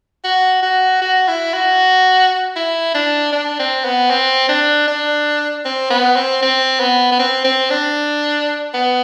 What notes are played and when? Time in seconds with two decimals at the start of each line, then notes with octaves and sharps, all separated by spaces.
0.24 F#4
0.63 F#4
1.02 F#4
1.28 E4
1.54 F#4
2.56 E4
2.94 D4
3.33 D4
3.59 C4
3.85 B3
4.10 C4
4.49 D4
4.87 D4
5.65 C4
5.90 B3
6.16 C4
6.42 C4
6.80 B3
7.12 B3
7.19 C4
7.44 C4
7.70 D4
8.74 B3